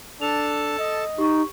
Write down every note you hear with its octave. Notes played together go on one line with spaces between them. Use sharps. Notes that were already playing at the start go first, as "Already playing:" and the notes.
D4 A4 A5 F7
D#5
D#4 G4 C#6